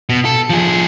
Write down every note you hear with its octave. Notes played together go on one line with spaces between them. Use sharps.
B2
A4
F3 G#4